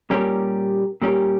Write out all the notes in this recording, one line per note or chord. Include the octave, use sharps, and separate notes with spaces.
A#2 G3 C#4 G4 A#4
A#2 G3 C#4 G4 A#4